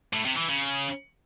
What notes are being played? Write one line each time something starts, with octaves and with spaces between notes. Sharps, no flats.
A2
C3
E3
C#3